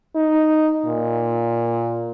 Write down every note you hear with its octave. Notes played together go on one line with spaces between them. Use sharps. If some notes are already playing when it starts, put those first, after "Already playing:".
D#4
A#2